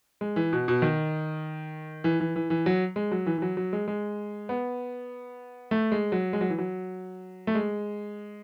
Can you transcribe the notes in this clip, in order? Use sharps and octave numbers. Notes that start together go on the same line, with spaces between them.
G#3
E3
B2
B2
D#3
E3
E3
E3
E3
F#3
G#3
F#3
E3
E3
F#3
F#3
G#3
G#3
B3
A3
G#3
F#3
G#3
F#3
E3
F#3
A3
G#3